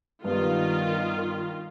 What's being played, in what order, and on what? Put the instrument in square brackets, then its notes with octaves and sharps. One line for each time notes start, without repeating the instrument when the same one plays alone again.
[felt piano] G2 B3 [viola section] D#3 F4